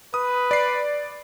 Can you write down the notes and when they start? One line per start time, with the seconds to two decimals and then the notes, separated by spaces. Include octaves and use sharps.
0.14 B4 D#6
0.51 D5 C7